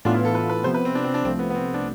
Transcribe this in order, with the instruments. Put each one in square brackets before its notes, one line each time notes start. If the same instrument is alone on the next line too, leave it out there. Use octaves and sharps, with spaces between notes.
[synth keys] A2 E3 B3 F4 [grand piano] D4
[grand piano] E4
A4
B4
B4
[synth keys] C3 F3 B3 [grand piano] C5
[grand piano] B4
C4
D4
C4
D4
[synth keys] C2 C3 F3 A3 [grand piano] C4
[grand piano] B3
B3
C4
D4